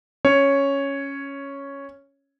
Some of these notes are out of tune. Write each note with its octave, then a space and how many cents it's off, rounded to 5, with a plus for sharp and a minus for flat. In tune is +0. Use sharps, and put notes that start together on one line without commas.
C#4 +0 C#5 +0